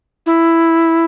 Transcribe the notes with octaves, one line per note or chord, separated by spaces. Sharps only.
E4